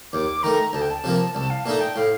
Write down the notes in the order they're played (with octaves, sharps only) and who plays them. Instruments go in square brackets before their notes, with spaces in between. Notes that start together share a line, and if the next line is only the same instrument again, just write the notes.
[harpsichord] D#2 [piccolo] D6
[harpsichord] D#3 A3 [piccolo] A#5
[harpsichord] D2 [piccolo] A5
[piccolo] G5
A5
[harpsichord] C3 F3 A#3
[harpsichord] C2 [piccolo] A5
[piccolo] F5
[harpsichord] A#2 A3 D#4 [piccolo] A5
[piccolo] G5
[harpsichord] A2 [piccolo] F5